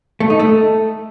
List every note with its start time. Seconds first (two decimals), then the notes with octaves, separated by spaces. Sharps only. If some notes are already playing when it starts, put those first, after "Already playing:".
0.20 A3
0.30 D#4
0.39 A3